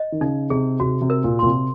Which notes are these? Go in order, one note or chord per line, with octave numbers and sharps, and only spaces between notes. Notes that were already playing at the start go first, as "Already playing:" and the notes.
Already playing: D#5
D#3
C#3 D#4
C3 G#4
C3 F#4
C3
A#4
A#2
A#2 C6
C3